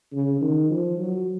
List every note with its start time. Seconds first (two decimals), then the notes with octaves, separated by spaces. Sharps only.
0.13 C#3
0.41 D#3
0.70 F3
0.98 F#3